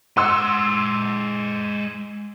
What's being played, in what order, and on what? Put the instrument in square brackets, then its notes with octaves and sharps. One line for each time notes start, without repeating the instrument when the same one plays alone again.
[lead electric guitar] G#3 F#5 [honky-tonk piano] C6 E6